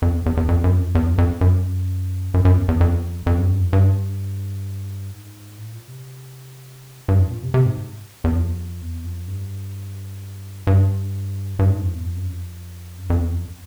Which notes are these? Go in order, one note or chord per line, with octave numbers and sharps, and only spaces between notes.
F2
E2
E2
E2
F2
F#2
F2
E2
F2
F#2
F2
F#2
F#2
F#2
E2
E2
F2
F2
F#2
G2
F2
G2
G#2
A2
A#2
C3
G2
F2
A#2
C3
C3
G#2
E2
F2
E2
F2
G2
G2
G2
G#2
F2
E2
F2
F#2
F2
F#2
F2
E2
F2